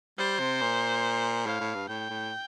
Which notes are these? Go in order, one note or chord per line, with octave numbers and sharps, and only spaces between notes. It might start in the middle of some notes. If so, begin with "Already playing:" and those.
G3 C5
C3
A#2
A2 F5
A2
G2
A2 G5
A2